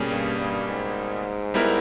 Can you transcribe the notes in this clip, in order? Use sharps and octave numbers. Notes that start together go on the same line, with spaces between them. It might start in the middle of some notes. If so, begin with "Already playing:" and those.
Already playing: B2 G3 A#3 C#4 G#4
G2
G2
G#2
G3 B3 E4 A#4